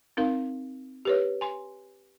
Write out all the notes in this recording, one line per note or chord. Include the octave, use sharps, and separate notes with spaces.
C4 D#4 A#4 F5
G4 B4 C#5
G#5 C6